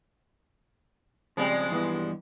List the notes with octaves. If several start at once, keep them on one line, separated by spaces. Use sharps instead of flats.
C#3 F3 G3 G#3 C4
G2 E3 B3